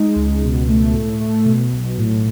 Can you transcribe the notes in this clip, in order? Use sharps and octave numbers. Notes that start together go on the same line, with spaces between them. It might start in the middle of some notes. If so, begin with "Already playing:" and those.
Already playing: G#3 D#4
C#2
B2
A3
A2
A3
B2
B1
A2